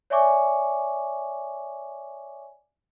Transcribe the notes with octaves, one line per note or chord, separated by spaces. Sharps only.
C#5 D5 E5 G#5 C#6 D6